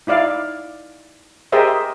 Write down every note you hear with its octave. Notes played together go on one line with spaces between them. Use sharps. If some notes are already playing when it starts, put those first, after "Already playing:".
D#4 E4 D5 F5
G4 G#4 A#4 C5 D#5 E5